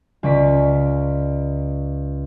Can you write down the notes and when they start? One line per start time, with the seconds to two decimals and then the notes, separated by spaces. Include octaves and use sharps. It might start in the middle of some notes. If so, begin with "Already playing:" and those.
0.23 C#2 C#4 D5 B6